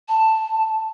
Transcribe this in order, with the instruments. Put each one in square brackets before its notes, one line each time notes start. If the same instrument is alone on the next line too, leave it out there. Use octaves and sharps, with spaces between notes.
[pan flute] A5